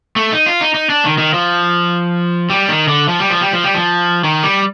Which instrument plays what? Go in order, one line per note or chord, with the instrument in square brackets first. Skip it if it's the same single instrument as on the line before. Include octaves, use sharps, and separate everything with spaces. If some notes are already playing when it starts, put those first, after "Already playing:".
[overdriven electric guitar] A3
D#4
F4
D#4
D#4
D4
D#3
D#3
F3
G3
D#3
D3
F3
G3
F3
G3
F3
G3
F3
D#3
G3